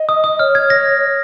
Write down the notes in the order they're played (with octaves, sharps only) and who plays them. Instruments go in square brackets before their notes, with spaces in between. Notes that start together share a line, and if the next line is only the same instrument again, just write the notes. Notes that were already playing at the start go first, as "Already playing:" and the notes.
Already playing: [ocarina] D#5
[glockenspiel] D#6
D#6
[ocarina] C#5 [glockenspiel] F6
[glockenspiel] G#6
A#6